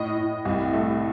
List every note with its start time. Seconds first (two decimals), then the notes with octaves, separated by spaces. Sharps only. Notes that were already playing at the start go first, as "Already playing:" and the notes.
Already playing: A2 D#5
0.17 A2
0.45 C2
0.73 A3